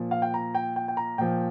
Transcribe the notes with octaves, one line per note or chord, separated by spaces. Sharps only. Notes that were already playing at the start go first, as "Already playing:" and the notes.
Already playing: A#2 F3
F5
G5
A#5
G5
G5
G5
A#5
A#2 F3 G5